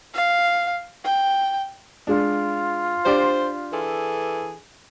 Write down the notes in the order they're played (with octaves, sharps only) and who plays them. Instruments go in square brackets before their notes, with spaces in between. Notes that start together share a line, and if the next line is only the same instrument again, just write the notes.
[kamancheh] F5
G5
[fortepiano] G#3 D4 [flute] F4
[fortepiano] D4 G4 D5 [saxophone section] C5
[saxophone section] E3 G#4 A4